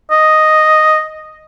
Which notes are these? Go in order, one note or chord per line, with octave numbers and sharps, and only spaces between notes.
D#5